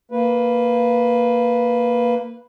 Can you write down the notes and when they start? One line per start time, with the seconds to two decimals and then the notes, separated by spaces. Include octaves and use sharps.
0.11 A#3 B4